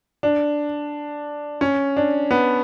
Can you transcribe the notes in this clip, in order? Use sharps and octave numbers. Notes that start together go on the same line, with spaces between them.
D4
C#4
D4
B3